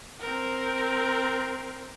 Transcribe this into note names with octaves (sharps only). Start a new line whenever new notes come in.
C4 A#4